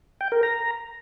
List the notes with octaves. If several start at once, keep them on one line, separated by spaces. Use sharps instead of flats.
G5
A#4
A#5